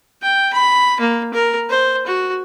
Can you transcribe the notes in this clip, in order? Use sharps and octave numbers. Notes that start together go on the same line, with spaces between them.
G5
B5
A#3
A#4
C5
F#4